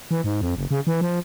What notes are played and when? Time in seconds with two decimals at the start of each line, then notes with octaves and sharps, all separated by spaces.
0.11 E3
0.24 G#2
0.41 F2
0.56 F#1
0.71 C#3
0.87 E3
1.01 F3